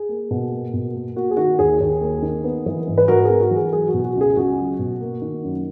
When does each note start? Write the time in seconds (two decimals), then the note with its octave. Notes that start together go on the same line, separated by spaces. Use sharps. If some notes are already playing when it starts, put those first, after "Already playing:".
Already playing: G#4
0.09 A#3
0.31 B2
0.52 A#3
0.73 B2
0.95 A#3
1.16 A#3 F#4
1.31 G#4
1.37 D#3 F#4
1.59 D#2 G#4
1.80 D#2
2.01 A#3
2.22 D#3
2.44 B3
2.66 E3
2.87 G#2
2.98 B4
3.08 G#2 F#4 A#4
3.24 B3 G#4
3.40 F#4
3.51 E3
3.56 G#4
3.72 F#3 G#4
3.88 F#4
3.94 B2
4.05 F#4
4.16 C#2
4.21 G#4
4.36 C#2 F#4
4.58 F#3
4.79 B2
5.00 A#3
5.22 D#3
5.43 F#2